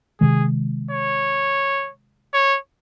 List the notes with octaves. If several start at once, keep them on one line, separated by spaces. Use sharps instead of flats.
C3 D#3 G#3 G#4
C#5
C#5